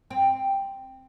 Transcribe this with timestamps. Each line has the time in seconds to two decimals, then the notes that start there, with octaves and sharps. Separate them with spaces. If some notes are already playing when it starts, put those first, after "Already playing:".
0.11 C4